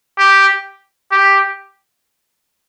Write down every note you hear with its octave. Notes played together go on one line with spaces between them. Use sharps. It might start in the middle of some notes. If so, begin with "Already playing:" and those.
G4
G4